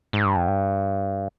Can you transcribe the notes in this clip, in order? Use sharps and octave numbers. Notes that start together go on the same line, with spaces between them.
G#2
G2
F2
G2